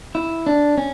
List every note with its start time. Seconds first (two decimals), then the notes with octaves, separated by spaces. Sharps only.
0.15 E4
0.47 D4
0.78 C#4